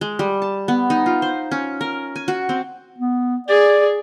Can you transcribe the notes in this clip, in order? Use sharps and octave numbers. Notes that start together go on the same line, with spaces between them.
G#3
G3
A5
B3
D#4
F4
C5
C#4
A#4
G#5
F#4
C4
B3
G#4 D5